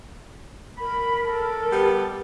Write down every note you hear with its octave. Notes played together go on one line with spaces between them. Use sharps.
A#4 B5
A4
G3 B3 G4